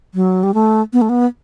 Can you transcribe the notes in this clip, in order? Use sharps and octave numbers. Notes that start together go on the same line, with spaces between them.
F#3
G3
A3
B3
A3
B3